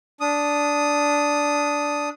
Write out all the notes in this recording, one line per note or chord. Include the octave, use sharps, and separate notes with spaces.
D4 D#6